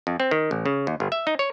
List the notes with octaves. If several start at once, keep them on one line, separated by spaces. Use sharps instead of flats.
F2
C4
D#3
A1
C#3
D#2
G1
E5
D#4
C#5